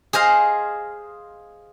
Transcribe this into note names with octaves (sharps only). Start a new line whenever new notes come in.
G#4 C5 D#5 F5